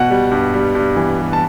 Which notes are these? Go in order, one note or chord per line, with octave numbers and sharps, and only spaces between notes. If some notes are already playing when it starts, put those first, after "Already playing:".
Already playing: B2 F#5
G3
G2
G3
G2
E3
G3
A5